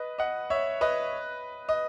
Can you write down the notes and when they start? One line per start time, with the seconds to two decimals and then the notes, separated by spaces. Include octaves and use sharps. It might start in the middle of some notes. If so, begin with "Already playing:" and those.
Already playing: B4 D#5
0.18 D#5 F#5
0.50 C#5 E5
0.81 B4 D#5
1.69 D#5